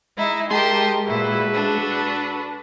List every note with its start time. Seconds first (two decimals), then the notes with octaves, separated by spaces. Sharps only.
0.17 G#3 D#4 E4
0.51 G#3 G4 A#4 D#5 A5 C6
1.07 A#2 E4 F#4 A4 B4
1.52 D4